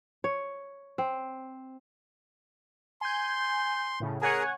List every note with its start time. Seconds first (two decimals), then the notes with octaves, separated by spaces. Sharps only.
0.24 C#5
0.98 C4
3.01 G#5 C6 G6
4.00 A2 C#3
4.22 G#4 A#4 C#5 F#5 G#5